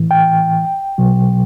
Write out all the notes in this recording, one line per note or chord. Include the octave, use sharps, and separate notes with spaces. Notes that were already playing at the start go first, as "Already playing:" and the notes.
Already playing: A2 E3
G5
B2 F#3